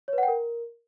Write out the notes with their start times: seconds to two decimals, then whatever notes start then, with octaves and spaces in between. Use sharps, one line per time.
0.08 C#5
0.13 B4
0.18 F#5
0.23 G5
0.28 A#4